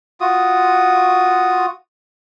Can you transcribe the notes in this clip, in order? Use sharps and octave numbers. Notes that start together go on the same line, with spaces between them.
F4 F#4 D#6